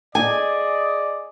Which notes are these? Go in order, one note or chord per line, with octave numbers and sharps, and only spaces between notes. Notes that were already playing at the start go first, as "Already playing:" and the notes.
G#4 D5 D#5 G#5